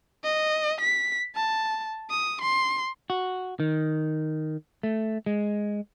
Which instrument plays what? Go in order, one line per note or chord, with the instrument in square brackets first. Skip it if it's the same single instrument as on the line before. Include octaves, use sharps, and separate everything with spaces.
[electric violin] D#5
B6
A5
D#6
C6
[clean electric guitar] F#4
D#3
A3
G#3